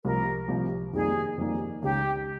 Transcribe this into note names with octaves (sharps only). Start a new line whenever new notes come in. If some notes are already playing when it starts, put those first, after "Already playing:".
C2 C3 F3 A#4
C2 C3 F3
F2 D#3 G3 A#3 G#4
F2 D#3 G3 A#3
C#2 C#3 G#3 D#4 G4